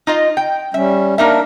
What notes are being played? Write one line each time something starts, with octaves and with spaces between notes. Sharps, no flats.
D#4 F4 D#5
G5
G3 C#4 E5
A#3 D4 D#4 A#4 E5